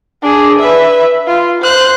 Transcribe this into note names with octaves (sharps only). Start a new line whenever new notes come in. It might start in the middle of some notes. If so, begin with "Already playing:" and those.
D4 G#4
B4 E5
F4
C5 F#6